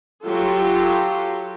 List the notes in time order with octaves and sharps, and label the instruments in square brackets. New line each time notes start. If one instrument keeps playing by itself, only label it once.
[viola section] F#3 F4 G4 A4